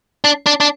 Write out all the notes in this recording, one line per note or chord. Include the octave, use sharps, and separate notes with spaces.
D4
D4
D4